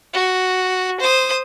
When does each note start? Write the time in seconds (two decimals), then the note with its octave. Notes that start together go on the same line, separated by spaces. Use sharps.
0.13 F#4
1.00 C5 D#6